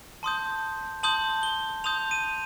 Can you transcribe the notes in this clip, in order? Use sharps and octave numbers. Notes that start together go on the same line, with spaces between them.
A5 C6 D#6 G6
A5 C6 D#6 G6 F#7
G7
A5 C6 D#6 G6 F7
D#7